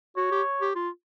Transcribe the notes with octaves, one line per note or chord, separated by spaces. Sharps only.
F#4 C#5
G4
G4
F4